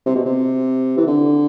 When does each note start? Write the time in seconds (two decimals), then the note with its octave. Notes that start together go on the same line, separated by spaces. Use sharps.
0.06 C3
0.16 B2
0.25 C3
0.97 E3
1.07 D3